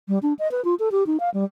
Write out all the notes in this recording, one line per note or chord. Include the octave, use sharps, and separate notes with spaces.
G3
D4
D#5
B4
F4
A4
G4
D#4
F5
G3